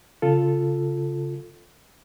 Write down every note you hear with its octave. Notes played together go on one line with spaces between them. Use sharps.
C#3 F4 A4